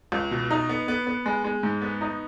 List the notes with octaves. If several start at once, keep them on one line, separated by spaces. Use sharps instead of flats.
C#2
B2
D#4
B3
B3
B3
G#3
G#3
G#2
B3
D#4